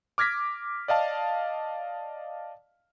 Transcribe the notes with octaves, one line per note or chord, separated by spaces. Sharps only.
D6 F6 G#6 A#6 B6
D5 D#5 F5 A5